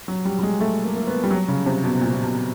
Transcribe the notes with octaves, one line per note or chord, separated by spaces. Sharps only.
F#3
G3
G3
G#3
A3
A#3
A#3
B3
G3
F#3
C#3
C3
B2
A#2
A#2
B2